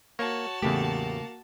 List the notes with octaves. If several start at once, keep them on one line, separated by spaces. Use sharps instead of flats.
A#3 F#4 C#5 A5
E2 A2 C#3 A3 A#3 G4